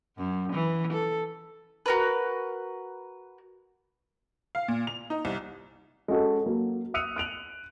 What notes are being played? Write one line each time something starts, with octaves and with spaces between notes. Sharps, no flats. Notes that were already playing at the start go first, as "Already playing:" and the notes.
F#2
E3
A4
F#4 A#4 B4
F5
A#2
F7
D#4
C2
G#3 C#4 F#4 A4
F#3 A#3
D#6 E6 F#6 C#7 D#7 F7
F#6 D7 F7 F#7